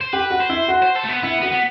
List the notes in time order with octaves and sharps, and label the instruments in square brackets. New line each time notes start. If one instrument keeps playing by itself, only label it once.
[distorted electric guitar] C5
[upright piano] G4 [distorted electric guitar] B4
[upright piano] F#4
[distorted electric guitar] C5
[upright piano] E4
F#4
[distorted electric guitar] C5
A4
A3
B3
[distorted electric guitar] B3 [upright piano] E4
[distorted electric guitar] B3 [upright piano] F#4
[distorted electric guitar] B3